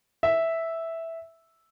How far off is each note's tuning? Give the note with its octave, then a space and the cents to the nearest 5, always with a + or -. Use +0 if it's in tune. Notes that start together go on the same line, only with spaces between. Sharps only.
E5 -5